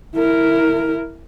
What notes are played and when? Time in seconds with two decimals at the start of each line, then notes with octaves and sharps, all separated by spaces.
0.15 E4 A#4